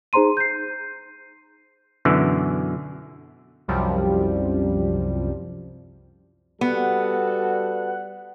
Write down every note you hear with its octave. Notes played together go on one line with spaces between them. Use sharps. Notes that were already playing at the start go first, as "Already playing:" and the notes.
D#4 G#4 C5 A#5 C6 D#7
G6 C7
F#2 B2 D3 E3
C2 F#2 C3 F3 G3
G3 B3 F#4 A4 F#5